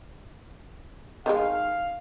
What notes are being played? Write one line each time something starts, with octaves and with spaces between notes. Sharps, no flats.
D#3 F#3 G#3 F5